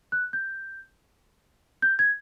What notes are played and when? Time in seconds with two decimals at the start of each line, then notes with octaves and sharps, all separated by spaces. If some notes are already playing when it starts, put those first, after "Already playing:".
0.12 F#6
0.33 G6
1.82 G6
1.99 G#6